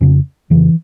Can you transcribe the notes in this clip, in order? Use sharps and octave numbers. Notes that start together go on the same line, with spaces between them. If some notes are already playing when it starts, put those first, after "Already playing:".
F2 C#3 C#4
F2 C#3 E3